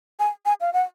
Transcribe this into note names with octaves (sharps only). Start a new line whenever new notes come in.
G#5
G#5
F5
F#5